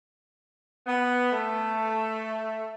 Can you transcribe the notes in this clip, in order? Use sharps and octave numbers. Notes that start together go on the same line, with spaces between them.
B3
A3